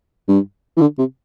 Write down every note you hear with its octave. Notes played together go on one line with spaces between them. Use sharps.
G2
E3
D3
C3